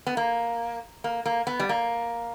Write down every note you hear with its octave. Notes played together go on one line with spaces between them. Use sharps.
B3
A#3
A#3
A#3
B3
G3
A#3